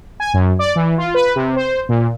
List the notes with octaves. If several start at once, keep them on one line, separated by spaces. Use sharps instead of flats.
G#5
F#2
D5
E3
F4
B4
C3
C5
A#2